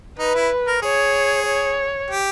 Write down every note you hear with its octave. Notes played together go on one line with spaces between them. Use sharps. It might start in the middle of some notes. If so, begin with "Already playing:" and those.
D#4 B4
E4
A#4
G#4 C#5
C#5
G4